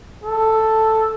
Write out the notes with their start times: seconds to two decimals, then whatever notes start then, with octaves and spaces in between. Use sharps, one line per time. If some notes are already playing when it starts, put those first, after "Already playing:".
0.24 A4